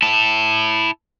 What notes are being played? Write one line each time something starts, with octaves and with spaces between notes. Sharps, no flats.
E4 A5